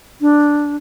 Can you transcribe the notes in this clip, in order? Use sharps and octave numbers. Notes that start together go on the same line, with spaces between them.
D4